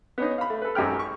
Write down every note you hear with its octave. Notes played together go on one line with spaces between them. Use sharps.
B3 C#4 D#4
F5 B5
A3
A4 B4
G#1 F#2 G4 G5 F6
C#6